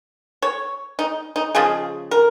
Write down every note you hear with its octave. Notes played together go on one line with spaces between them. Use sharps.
C#5
D#4
D#4
C#3 F3 G#3 G#4
A#4